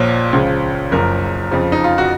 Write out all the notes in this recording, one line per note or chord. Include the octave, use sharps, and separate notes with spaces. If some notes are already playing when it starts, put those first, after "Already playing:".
Already playing: A#1 A#2 F3 C#5
C#2 C#3 F3
F#1 F#2 F3 A#4
F2 C#3 F3
D#4
F4
F#4